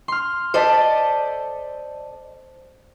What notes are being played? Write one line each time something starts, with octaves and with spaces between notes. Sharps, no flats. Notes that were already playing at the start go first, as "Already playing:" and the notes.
C6 F6
A4 C5 D5 D#5 A5 B6